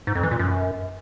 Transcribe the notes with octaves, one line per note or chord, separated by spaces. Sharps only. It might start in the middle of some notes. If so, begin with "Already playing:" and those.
G#2
F2
E3
A#2
F#2